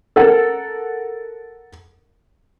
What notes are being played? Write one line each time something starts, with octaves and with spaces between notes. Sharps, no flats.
A4 A#4 F#5